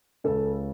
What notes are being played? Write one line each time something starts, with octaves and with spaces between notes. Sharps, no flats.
C#2 C#3 A4